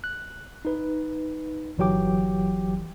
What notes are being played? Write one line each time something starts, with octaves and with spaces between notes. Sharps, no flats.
F#6
D#4 B4
G1 E3 F#3 G4 G5 D6